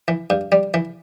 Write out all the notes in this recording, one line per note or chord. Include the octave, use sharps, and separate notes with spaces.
E3
G2
G3
E3